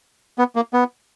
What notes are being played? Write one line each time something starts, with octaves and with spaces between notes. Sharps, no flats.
B3
A#3
B3